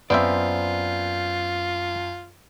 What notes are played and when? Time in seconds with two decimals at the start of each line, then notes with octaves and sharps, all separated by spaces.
0.10 F#2 B3 C4 F4 C5 D5 E5